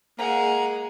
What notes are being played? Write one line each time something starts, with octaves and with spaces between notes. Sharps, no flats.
G#3 A#3 G#4 F#5 A#5